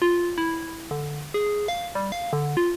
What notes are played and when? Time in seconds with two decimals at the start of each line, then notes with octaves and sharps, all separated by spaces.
0.02 F4
0.38 E4
0.91 D3
1.34 G#4
1.68 F5
1.95 G3
2.12 F5
2.33 D3
2.57 F4